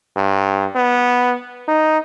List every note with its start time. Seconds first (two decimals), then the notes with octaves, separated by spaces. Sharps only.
0.16 G2
0.75 B3
1.68 D#4